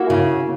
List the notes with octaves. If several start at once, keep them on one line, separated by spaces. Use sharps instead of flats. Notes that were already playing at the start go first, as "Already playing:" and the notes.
Already playing: A#3 E4 F#4
C#3